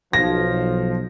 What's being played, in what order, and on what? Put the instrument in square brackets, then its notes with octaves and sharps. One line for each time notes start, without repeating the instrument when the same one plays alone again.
[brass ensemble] B1 [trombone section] F3 [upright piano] A#6